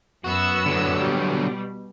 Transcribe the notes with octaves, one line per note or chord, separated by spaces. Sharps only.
F#2 B3 F#4 E6
D3 F#3
B2 G3